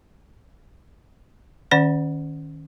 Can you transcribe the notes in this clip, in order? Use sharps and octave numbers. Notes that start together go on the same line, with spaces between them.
D#3 C#4 D5 F#5